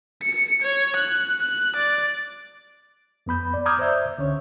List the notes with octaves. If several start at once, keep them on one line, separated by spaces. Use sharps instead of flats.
C#7
C#5
F#6
F#6
D5
F2 B3 B5 G6
D5
A#5 D6 D#6 F6 G6 G#6
C5 D5 E5 G6
C#2 D3 C#4 C#5